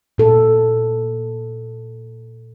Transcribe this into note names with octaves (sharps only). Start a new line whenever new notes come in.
A#2 A4